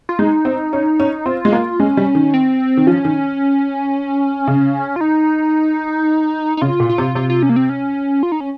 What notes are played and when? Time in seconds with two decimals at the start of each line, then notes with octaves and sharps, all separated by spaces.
0.09 F4
0.19 G#3 D#4
0.45 C4
0.73 C#4
1.00 C#4
1.26 C4 F4
1.45 G#3
1.53 A#3
1.80 G#3 C#4
1.97 G3
2.15 D#3
2.34 C4
2.77 D#3
2.87 F3 C#4
3.05 D#3
4.47 C#3
4.96 F4
5.01 D#4
6.57 D#4
6.61 C#3 F4
6.80 A#2
6.89 F4
6.98 C3
7.15 C3 F4
7.30 F4
7.43 C#4
7.49 A#3
7.56 C4
7.69 C#4
8.23 F4
8.32 D#4
8.40 C#4